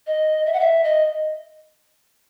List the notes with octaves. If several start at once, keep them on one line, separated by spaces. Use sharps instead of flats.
D#5
E5
F#5
E5
D#5